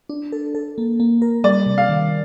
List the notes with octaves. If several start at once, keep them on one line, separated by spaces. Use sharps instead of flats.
D4
A4
A4
A#3
A#3
A#4
G3 D5
C3
F5
D#3